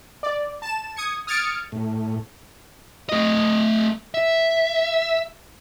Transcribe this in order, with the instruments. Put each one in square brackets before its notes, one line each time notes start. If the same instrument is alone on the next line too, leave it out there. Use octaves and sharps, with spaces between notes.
[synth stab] D5
A5 E7
D#6 G#6 C#7
D#6 F6 G#6 A6 C#7 D7
[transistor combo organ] A2
[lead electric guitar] A3 D#5
E5